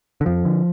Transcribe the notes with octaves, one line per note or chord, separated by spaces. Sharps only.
D3
F2 F3
D3